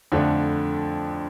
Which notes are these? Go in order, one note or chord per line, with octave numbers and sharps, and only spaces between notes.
F2 D3 F3 A3 D4